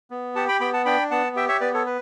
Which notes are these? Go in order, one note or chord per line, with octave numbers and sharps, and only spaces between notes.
B3
G4 F#5 A5
G5 B5
B3 G5 B5
F#5 A5
D4 G5 B5
B3 F#5 A5
G4 E5 G5
C#5 E5
B3 B4 D5
A4 C#5
B4